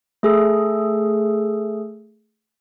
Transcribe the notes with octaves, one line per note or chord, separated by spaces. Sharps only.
A3 G#4 A4